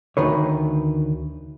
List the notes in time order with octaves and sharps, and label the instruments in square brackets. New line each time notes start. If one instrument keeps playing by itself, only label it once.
[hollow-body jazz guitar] D2 D#3 B4 C#5